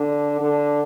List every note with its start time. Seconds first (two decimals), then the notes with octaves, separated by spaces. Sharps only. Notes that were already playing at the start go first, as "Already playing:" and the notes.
Already playing: D3
0.40 D3